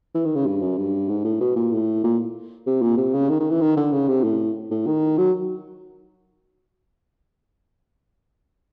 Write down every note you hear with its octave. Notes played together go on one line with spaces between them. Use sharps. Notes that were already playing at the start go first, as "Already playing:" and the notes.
E3
D#3
C#3
G2
F#2
G2
G#2
A2
B2
A#2
A2
A#2
C3
A#2
C3
C#3
D#3
D#3
E3
D#3
D3
C#3
C3
A2
A2
D#3
F#3